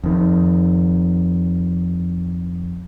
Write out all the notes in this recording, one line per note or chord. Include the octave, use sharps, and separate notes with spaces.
F2 D#3